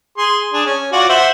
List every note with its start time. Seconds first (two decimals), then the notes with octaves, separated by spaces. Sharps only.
0.18 G#4 C6
0.53 D4 G#4
0.66 C#4
0.92 F4 F#4 D5
1.09 C5 E5 F#5